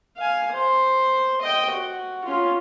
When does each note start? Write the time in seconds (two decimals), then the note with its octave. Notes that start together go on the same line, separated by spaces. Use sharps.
0.17 F5 G#5
0.52 C5
1.41 D#5 G5
1.71 F#4
2.25 C#4 F4